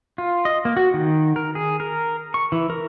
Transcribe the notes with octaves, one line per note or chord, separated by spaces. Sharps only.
F4
D#5
A#3
F#4
D#3
A#4
G#4
A#4
C#6
E3
A#4